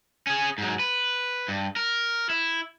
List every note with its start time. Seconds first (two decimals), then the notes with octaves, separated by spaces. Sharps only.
0.27 C#4 G#4
0.58 G#2 F#3
0.79 B4
1.48 G2
1.76 A#4
2.29 E4